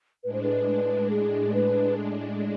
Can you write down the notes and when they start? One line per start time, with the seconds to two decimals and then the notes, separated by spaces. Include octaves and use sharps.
0.24 A2 G#3 D4 B4
0.33 C5
0.43 B4
1.10 G#4
1.54 B4